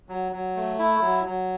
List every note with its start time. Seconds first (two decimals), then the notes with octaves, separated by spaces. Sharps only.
0.09 F#3
0.32 F#3
0.56 A3
0.79 E4
1.01 F#3
1.25 F#3